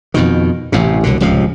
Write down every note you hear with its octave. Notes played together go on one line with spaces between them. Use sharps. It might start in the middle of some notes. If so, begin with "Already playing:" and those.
F2 B2 D#3
A1 A2 C3
C2 B2 D3
D1 C#2 C3 F3